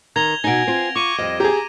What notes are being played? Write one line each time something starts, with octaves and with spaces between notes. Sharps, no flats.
D#3 A#5 G#6 F7 G7
B2 D#4 G#5 A#6 D7
C4 F4
F4 C#6 D6 D#7 F7
F2 G3 D#5
G4 G#4 A#5